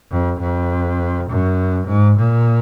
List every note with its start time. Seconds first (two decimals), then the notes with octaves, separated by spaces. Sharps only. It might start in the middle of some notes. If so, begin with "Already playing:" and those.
0.11 F2
0.40 F2
1.29 F#2
1.88 G#2
2.18 A#2